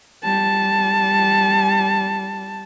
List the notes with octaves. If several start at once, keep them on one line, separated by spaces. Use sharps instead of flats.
G3 A5